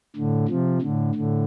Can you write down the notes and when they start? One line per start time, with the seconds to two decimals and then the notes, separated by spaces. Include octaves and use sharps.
0.16 A2 D3
0.49 C3 F3
0.82 A2 D3
1.15 A2 D3